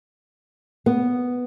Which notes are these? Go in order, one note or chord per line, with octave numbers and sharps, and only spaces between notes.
B3